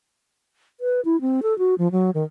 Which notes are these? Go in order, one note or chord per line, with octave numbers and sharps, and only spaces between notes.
B4
E4
C4
A4
F#4
F3
F#3
D#3